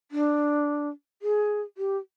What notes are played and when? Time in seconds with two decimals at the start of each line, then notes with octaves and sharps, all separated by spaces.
0.11 D4
1.22 G#4
1.78 G4